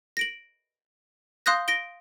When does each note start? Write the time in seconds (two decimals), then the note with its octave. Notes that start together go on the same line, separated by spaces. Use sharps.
0.17 A#6 D7 F#7
1.46 F5 C6 D#6 F#6 G6 A#6
1.68 A#6 D7 G7